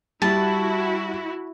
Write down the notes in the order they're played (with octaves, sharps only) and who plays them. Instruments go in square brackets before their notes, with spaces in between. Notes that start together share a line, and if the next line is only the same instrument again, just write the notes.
[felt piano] G3 [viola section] E4 F#4 [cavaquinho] A5